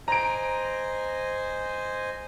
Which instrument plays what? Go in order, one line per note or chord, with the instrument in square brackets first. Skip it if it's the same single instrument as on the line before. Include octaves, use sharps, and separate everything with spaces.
[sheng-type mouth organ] C5 D#5 G#5 [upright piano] A#5 D7